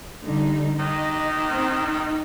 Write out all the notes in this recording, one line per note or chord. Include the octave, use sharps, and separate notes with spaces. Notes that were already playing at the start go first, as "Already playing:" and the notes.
D3 G3 D#4
D#3 D#5
C4
D#4